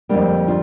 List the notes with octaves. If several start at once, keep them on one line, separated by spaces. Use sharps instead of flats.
F2 D3 G3 A#3 D4
D4 F4